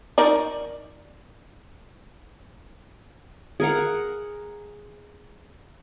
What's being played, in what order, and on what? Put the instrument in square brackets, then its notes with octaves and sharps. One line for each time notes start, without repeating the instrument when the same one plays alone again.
[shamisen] D#4 A#4 D5
[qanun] G#4 A#4 F#5